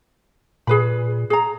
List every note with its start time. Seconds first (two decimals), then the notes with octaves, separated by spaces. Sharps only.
0.67 A#2 G#4 B4 B5
1.30 G#4 A#5